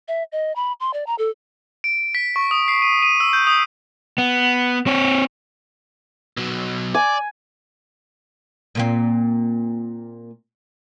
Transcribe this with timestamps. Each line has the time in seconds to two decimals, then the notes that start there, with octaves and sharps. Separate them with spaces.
0.08 E5
0.32 D#5
0.56 B5
0.80 C6
0.93 D5
1.07 A#5
1.18 A4
1.84 D7
2.15 B6
2.36 C#6
2.51 D#6
2.68 C7
2.82 D#7
3.03 D#7
3.20 E6
3.33 G6
3.47 D#6
4.18 B3
4.86 C4 C#5
6.37 B2 F#3
6.95 D5 G#5
8.75 A#2 A#3 C4